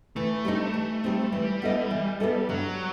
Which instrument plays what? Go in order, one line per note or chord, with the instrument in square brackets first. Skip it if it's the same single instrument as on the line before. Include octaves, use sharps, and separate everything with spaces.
[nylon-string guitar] E3 [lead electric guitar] A3
[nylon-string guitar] G3 C4 D#4
E3
G3 C4 D#4
[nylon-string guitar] E3 [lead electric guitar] G3
[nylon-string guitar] B3 E4 A4 D#5
E3
B3 E4 A4 D#5
[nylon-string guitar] G2 [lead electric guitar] F#3